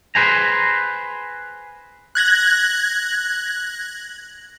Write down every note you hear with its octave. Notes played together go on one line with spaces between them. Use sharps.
G#4 B4 C5 G#5 A#5
F#6 G#6 A#6 F#7